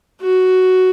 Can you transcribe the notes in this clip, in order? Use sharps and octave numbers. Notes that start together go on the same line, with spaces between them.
F#4